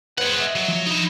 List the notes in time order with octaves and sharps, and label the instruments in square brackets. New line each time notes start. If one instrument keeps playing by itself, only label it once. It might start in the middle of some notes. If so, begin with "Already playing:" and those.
[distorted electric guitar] G#4 F#5 [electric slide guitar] B4 C5
[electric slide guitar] D#5 E5
[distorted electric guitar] F#3
[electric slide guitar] F3
[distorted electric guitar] D#4 E4